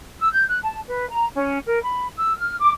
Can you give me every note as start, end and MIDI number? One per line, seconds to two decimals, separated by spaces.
0.19 0.32 88
0.32 0.44 91
0.49 0.58 90
0.63 0.79 81
0.88 1.07 71
1.11 1.26 82
1.35 1.58 61
1.65 1.82 70
1.83 2.07 83
2.17 2.35 88
2.37 2.55 89
2.59 2.71 86